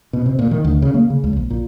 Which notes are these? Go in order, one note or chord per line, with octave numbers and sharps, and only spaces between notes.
B2
C3
A#2
D#3
D2
C#3
A#3
C#3
C#2
A#1
A#2